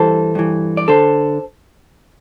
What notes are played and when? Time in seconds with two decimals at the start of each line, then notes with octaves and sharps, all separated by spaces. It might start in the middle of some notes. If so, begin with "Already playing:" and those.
Already playing: G2 E3 A4 C5
0.35 G2 E3
0.77 D5
0.88 D3 A4 C5